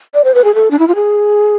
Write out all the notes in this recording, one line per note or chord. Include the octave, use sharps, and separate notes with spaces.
D5
C5
B4
G#4
A4
D4
E4
F4
G#4